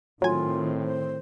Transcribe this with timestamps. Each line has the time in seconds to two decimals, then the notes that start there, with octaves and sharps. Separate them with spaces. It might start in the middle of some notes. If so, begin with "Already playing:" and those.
0.22 A2 D#3 F#3 C4 F4 G#5
0.83 C5